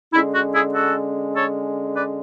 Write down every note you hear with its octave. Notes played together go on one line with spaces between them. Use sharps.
D3 G#3 C#4 E4
F#4
E4 G#4
F#4 A4
A4 C#5
B4 D5